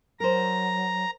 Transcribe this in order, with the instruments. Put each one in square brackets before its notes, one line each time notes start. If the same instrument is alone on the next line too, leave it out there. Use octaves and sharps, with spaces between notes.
[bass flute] F#3 [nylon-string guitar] A#4 C5 [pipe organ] A#5